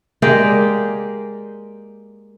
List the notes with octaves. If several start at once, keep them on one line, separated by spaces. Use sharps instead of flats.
G#3 A#3 G4 D5